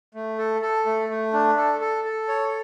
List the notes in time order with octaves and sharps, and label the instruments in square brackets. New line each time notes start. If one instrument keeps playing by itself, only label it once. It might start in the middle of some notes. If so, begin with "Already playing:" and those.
[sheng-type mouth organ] A3
A4
A4
A3
A3
D4
A4
A4
A4
C#5